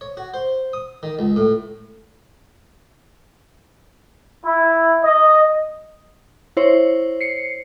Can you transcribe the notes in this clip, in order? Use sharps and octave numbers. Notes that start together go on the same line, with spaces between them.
C#5
F#4
C5
D#6
D#3
C#2
A2
E4
D#5
E4 C5 C#5
C7 C#7